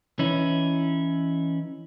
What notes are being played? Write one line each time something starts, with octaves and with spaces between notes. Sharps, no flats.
E3 C#4 D#4 E4